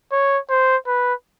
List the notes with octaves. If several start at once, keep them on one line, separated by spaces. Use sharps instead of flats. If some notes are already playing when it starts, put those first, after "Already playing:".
C#5
C5
B4